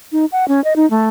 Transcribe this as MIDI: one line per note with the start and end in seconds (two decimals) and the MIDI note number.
0.12 0.25 63
0.32 0.45 78
0.48 0.63 61
0.64 0.73 75
0.76 0.88 63
0.90 1.09 57